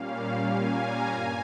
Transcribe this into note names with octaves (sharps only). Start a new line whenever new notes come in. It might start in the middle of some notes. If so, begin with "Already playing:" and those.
Already playing: A#2 G3 A#3 C#4 F5
G#5
A#5
G2 G#5